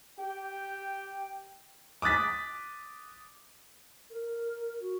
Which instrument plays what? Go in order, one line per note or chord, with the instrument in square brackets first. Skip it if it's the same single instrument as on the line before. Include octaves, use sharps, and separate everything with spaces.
[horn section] G4 G5
[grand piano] D6 D#6 F#6 A6 B6
[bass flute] A#4
F#4